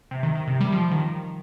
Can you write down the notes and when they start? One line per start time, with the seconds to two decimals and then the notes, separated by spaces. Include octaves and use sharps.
0.11 C3
0.23 D#3
0.36 D#3
0.48 C3
0.60 G3
0.72 F3
0.91 D#3